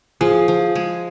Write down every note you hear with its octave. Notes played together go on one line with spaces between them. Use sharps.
F3 G#4
F3
G#3